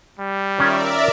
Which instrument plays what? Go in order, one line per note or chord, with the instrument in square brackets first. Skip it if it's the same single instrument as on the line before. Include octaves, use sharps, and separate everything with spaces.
[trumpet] G3
[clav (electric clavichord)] D#3 C#4 F4 [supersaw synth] A#4 D5 E5